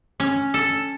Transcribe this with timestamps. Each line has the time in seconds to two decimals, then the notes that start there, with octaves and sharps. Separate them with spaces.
0.20 C#4
0.54 A4